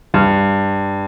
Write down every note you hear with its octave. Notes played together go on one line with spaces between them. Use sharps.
G2